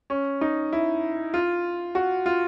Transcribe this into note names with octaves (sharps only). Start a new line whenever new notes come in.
C#4
D#4
E4
F4
F#4
F4